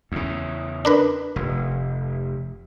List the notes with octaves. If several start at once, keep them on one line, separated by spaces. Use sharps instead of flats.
E2 C#3
D4 A#4 B4
F1